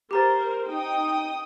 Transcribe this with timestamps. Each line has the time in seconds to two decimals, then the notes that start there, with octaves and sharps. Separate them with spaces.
0.11 G4 A#4 C5 A#5 A6
0.69 D#4 G5 D#6